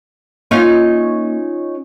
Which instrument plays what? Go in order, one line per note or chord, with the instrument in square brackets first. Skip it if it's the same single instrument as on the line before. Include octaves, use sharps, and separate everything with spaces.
[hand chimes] A#3 [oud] C#4 D#4 F4